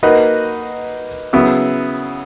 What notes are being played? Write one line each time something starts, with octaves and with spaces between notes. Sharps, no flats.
A#3 D#4 F#4 B4 D#5
C#3 F#3 B3 E4